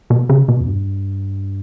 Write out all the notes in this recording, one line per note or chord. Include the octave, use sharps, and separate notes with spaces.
B2
C#3
B2
E2
G2